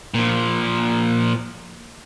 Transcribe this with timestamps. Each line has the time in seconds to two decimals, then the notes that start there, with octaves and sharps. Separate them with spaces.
0.14 A#2 F3